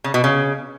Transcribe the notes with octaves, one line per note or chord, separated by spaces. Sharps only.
C#3
B2
C#3